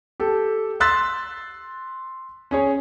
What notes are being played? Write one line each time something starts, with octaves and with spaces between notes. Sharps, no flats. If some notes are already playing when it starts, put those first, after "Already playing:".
G4 A4
C6 E6 F#6 A6 B6
C#4 G#4 C#5